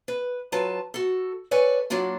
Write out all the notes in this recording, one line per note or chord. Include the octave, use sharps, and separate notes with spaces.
B4
F#3 F4 B4 A5
F#4 A4
A4 B4 C#5 D5 G#5
F#3 A#3 D4 F4 F#4